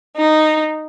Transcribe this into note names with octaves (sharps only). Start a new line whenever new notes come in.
D#4